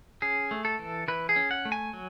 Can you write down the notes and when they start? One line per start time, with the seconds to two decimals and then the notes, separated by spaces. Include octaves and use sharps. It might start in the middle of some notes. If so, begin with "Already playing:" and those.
0.22 C#4 G#4
0.51 A3
0.65 A4
0.79 E3
1.08 E3 B4
1.29 G#4
1.36 C#4
1.51 F#5
1.65 A3
1.72 G#5
1.93 F#3